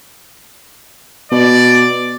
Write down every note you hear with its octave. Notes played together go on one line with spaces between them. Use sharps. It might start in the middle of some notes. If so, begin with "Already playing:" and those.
B2 D5